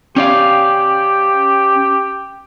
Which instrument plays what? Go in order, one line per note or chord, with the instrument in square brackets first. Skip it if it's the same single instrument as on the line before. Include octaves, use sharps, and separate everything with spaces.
[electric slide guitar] C#4 D5 F5 [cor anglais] G4